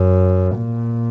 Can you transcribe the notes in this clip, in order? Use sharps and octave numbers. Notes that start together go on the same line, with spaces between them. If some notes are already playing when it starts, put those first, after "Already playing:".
Already playing: F#2
A#2